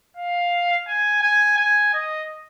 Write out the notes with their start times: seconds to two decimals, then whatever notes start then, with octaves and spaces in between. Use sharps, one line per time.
0.17 F5
0.88 G#5
1.22 G#5
1.57 G#5
1.94 D#5